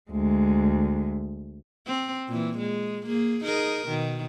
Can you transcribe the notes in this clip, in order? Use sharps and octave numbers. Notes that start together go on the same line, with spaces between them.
D2 G#3
C4
A#2 E3
G#3
A#3 G#4
D#4 G#4 A#4
B2 D#3